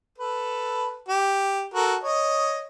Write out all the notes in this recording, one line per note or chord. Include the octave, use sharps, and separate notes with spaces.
A4 B4
G4
F#4 A4 A#4
C#5 D#5